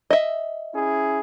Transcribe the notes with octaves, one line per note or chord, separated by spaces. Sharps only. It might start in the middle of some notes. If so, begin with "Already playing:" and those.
D#5 E5
C#4 E4 G#4